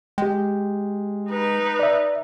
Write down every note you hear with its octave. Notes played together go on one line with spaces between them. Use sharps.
G#3 G4 G5
D#4 B4
D5 E5